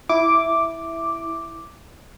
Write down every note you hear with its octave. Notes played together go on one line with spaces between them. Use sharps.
E4 D6